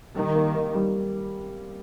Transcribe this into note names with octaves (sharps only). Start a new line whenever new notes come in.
D#3 G3
A#3
A#3
G3